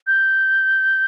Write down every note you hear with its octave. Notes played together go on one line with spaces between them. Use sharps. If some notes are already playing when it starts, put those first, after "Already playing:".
G6